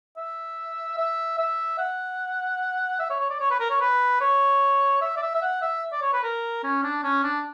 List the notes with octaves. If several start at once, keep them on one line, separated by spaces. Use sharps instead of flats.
E5
E5
E5
F#5
E5
C#5
C#5
D5
C#5
B4
A#4
C#5
B4
C#5
E5
D5
E5
E5
F#5
E5
D5
C#5
B4
A#4
C#4
D4
C#4
D4